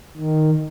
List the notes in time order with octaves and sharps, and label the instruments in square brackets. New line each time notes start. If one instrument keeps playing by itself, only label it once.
[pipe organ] D#3